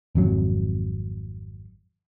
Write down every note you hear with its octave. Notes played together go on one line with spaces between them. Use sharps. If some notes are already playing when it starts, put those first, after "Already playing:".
G#1 F2 F#3